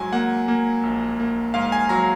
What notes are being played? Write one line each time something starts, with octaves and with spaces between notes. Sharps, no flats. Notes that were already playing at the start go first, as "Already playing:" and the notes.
Already playing: G#2 F#3 G#5
A#3 F#5
A#3
A#1
A#3
G#2 F5
G#5
F#3 A#5